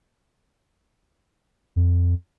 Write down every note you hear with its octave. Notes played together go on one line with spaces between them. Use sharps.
F2